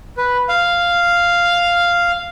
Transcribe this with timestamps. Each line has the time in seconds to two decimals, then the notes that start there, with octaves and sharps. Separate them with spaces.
0.17 B4
0.49 F5